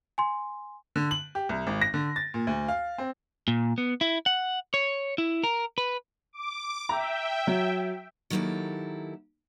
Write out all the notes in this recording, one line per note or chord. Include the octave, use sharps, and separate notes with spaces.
G#5 C6
D3
F#7
G4
C2
G#1
A#6
D3
A6
A#2
D2
F5
C4
A#2
B3
E4
F#5
C#5
E4
A#4
B4
D6
E5 G5 A#5
F#3
D#3 F#3 A#3 E4 G4 A4